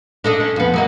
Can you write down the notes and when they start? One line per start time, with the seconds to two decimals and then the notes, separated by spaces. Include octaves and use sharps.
0.24 D4 A4 D#5
0.40 C#4
0.56 F2 B3
0.74 F#3 A#3 D#5